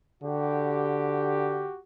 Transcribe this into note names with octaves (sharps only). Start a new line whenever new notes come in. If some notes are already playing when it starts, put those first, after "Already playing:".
D3 F#4 G4